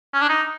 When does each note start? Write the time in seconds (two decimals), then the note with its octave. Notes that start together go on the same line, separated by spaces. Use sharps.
0.14 C#4
0.22 D4
0.29 D#4